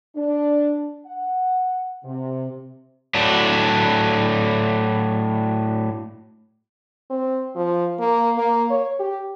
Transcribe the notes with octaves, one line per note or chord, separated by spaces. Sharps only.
D4
F#5
C3
A2 F#3 D4
C4
F3
A#3
A#3
C#5
G4